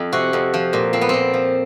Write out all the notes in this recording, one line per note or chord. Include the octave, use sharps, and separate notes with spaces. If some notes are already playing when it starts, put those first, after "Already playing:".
Already playing: F2
C3 F#4
F2
F3
A#2
F3 C4
B3
A#2 C4
F3